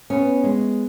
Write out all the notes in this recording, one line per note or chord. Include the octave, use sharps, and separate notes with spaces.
B3 C#4
G#3